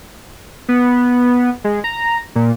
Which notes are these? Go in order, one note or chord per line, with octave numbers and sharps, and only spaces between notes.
B3
G#3
A#5
A#2